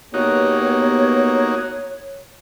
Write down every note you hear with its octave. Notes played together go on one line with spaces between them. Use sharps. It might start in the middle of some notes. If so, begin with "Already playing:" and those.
A#3 B3 D#4 F#4 G4 C#5